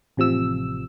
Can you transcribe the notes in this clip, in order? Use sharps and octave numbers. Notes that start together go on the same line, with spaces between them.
A1 C3 F3 E6